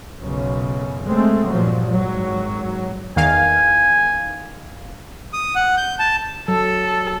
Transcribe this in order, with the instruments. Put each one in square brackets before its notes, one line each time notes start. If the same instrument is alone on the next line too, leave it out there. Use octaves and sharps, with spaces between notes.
[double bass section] B1 F#2 C#3
G#3 A3 C4
G2 A#2 F3 F#3
G#1 F#3
[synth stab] E2 D#3 F5 [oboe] G#5
[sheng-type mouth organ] D#6
F#5
G6
A5
[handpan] F#3 [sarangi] A4